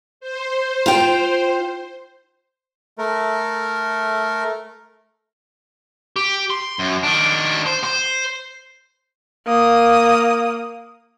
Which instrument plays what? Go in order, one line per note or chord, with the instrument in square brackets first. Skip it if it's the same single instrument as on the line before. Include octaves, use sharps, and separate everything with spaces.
[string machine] C5
[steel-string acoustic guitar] F4 G5
[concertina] A3 A#4
[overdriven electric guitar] G4
C6
F#2
D#3 D4
C5
C5
[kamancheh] A#3 D#6